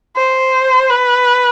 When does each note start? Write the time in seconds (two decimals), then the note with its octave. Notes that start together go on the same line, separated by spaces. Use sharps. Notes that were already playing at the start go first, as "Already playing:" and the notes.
0.16 C5
0.90 B4